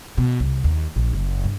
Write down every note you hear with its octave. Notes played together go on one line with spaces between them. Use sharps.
B2
C2
D#2
A#1
F#1
G2